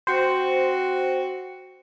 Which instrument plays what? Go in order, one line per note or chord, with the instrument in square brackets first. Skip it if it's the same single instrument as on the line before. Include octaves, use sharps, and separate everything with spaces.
[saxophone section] C4 F#4 [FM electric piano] C5